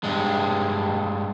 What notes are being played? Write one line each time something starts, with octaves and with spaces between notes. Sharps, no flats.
G2 G#3